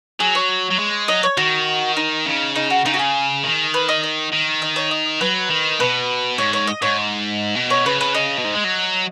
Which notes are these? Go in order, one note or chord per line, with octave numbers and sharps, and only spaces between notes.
F#3 G#4
C#5
F#3
G#3
F#3 D#5
C#5
D#3 F#4
D#4
C#3
D#4
F#4
C#3 D#4
F#4
G#4
D#3
B4
D#5
D#5
D#3
D#5
C#5
D#5
F#3 B4
D#3
B2 B4
G#2 C#5
C#5
D#5
G#2 C#5
B2
C#5
C#3 B4
B4
D#5
B2
G#2
G#3
F#3